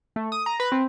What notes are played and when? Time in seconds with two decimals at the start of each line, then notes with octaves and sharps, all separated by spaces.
0.16 A3
0.32 D#6
0.46 A#5
0.60 B4
0.72 C4